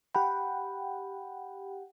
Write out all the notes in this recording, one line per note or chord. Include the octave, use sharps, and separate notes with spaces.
G4 F#5 G5 B5